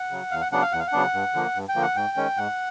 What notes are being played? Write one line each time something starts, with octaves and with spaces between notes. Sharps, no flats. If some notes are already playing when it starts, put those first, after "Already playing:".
Already playing: F#5
C#3 F#3
E2 F5
F#5
C#3 F#3 B3 D4 F#5
F5
E2 F#5
F5
F#5
C#3 F#3 B3 D4
G2
D3 F3 A#3
G2
G5
D3 F3 A#3
F#5
G#2 G5
D#3 G#3 C#4
G#2 F#5